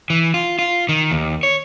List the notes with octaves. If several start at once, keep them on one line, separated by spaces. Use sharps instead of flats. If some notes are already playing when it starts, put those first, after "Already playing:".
E3
F4
F4
D#3
D#2
C#5